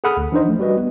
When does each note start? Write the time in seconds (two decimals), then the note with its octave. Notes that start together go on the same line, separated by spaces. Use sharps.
0.04 G#4 A4 F#5 B5 D#6 F6
0.17 D2
0.32 E3 D4 D#4 C5 D#5
0.45 F3 A3
0.59 G3 F#4 B4 D#5
0.77 B3